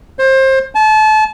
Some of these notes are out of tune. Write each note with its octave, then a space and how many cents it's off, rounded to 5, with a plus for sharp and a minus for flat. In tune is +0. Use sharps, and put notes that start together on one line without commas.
C5 +25
A5 -30